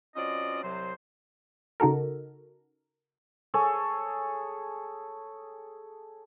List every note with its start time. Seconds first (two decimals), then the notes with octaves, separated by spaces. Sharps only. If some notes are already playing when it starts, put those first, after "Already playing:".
0.16 F#3 C4 C#4 F4 D5 D#5
0.64 C2 C3 F#3 C5
1.80 C#3 D#4 F#4 A4 A#4
3.54 G#4 A4 C#5